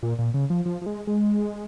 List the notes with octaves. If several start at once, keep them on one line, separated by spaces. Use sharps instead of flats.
A#2
A#2
C#3
F3
F3
F3
G#3
G#3